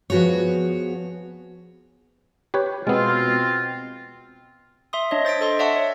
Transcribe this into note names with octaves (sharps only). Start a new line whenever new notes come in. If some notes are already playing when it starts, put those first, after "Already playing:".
F3 B3 F#4 G#4 C#5
G4 B4 C#5
B2 G#3 B3 C4 F4
E5 C6 D#6
D4 C#5 D#5
C5 A6 B6 D7
A4 D#5 C6
D5 E5 F#5 A5 C#6
C#5